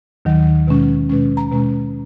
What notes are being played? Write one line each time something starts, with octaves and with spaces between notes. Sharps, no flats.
D#2 D#3 F#3
B2 G#3 C#4
B2 G#3 C#4
A#5
B2 G#3 C#4